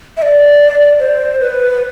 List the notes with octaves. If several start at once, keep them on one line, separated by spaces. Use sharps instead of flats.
E5
D5
C5
B4